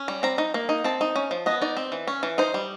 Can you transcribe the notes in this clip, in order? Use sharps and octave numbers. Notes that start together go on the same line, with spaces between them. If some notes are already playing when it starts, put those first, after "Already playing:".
Already playing: C#4
G3
C4 A#5
D#4
A#3
D#4
C4 A5
D#4
C#4
F3
B3 D#5
D#4 D5
C4
E3
C#4
E3
D#4 C5
G3